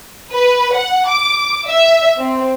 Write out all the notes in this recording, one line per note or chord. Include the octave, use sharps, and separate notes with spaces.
B4
F#5
D6
E5
C4